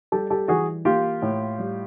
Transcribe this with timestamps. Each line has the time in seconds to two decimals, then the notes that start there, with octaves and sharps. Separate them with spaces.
0.12 G3 G4 A4
0.30 G4 A4
0.48 E3 F#4 G#4
0.85 A#3 F4 G4
1.22 A2
1.58 G3